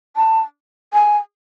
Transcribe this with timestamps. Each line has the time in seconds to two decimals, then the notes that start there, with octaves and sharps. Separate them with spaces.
0.16 A5
0.93 G#5